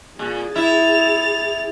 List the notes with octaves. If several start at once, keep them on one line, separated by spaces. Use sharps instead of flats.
A#2 G#4
E4 A6 F7